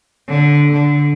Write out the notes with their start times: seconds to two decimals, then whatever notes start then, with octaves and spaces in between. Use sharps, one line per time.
0.28 D3
0.72 D3